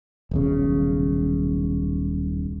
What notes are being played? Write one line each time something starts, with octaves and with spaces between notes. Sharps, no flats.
D#1 B1 C#3